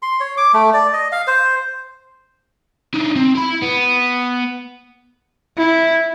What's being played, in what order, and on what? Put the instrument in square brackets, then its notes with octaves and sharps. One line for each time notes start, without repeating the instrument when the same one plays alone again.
[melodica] C6
C#5
D6
A3
D5
D#5
F5
C5
[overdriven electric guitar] D4 D#4
C4
E4 B5
B3
[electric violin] E4